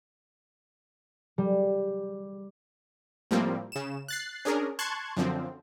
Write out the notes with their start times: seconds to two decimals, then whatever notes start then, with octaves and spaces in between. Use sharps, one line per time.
1.38 G3
3.31 A2 F3 G3 A#3 C4
3.72 C#3 E7
4.08 F#6 A6 C7
4.45 C#4 D4 G#4 A#4
4.79 A5 C6 C#6 F#6 G#6
5.17 F#2 D3 F3 C4